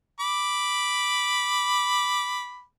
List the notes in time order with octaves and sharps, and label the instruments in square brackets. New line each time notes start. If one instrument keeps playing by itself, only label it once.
[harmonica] B5 D6